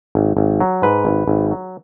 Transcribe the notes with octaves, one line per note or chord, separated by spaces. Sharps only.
G#1
G#1
F#3
G#2 B4
G#1
G#1
F#3